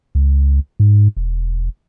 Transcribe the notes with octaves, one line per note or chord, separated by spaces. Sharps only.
C#2
G#2
E1